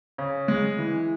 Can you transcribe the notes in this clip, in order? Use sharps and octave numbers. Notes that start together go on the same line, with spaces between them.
C#3
G#3
E3